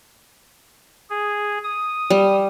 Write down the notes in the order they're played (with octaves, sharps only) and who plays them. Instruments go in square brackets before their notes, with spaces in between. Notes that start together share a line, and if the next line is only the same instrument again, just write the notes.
[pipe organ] G#4
D#6
[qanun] G3